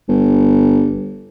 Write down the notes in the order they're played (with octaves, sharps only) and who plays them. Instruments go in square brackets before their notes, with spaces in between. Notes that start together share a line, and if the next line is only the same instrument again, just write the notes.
[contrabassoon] G1